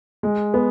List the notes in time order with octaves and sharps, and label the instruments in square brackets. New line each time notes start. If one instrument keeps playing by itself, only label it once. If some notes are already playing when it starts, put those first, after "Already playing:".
[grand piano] G#3
B3